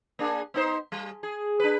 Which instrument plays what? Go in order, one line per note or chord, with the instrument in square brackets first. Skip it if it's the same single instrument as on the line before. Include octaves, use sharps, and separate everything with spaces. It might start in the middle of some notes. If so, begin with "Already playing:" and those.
[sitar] A#3 D4 G#4
B3 D#4 C5
G3
G#4
D4 B4